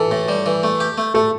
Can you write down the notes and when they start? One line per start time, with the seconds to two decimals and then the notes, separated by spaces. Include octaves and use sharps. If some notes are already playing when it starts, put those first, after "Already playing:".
Already playing: E3 A4
0.11 A2
0.28 G3
0.46 E3
0.63 A3
0.80 G4
0.98 A3
1.14 A3 A4